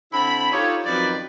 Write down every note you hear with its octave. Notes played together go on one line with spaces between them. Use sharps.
D3 C4 E4 B5
D#4 F4 G4 A4 C#5
F#2 D#3 F3 C4 B4 D5